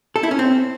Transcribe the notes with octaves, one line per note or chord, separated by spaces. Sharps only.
A4
E4
C#4
C4